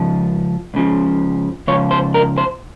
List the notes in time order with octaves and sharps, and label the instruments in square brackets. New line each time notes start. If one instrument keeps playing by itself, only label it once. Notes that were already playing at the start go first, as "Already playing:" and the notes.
Already playing: [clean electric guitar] C#2 C#3 F3
C#2 C#3 F3
C#2 C#3 F3 C#5
C5
A#4
C5